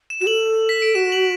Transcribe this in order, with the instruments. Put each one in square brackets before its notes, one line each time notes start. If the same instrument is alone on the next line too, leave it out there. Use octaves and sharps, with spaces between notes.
[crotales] E7
[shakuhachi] F#4 [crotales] E7
[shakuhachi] A4 [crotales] F#7
[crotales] B6
D7
[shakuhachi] F#4 [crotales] E7
[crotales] F#7